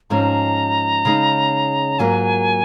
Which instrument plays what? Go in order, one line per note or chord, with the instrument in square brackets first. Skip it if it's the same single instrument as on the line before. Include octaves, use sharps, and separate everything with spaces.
[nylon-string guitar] G#2 F3 G#3 C#4 [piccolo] A#5
[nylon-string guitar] C#3 G#3 D#4
[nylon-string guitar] G#2 F#3 A#3 F4 A#4 [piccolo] G#5